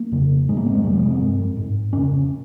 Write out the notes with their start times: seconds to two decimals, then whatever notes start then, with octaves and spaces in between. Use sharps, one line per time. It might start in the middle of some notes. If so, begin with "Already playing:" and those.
Already playing: A#3
0.12 F2 C#3
0.48 G#2 G#3
0.57 A#3
0.66 C4
0.75 G#3
0.84 F2 C3 G3
0.93 F3
1.03 G#3
1.11 C4
1.20 G2
1.57 G#2
1.93 F2 C#3 C#4